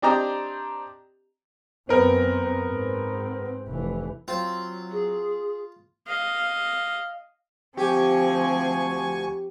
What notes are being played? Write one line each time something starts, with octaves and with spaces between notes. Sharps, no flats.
C4 D4 G4 D#5 G5 A#5
F#2 B3 C4 A#4 B4
G#2 C4
F1 E3
F#3 C4 F4
G#4
D#5 F5
D2 F3 C4 G4 G#5 C#6